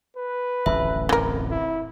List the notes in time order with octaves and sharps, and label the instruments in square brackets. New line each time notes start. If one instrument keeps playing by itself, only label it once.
[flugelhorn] B4
[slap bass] D1 A1 F2 [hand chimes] E5
[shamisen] E3 A#4 [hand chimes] C4
[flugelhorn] E4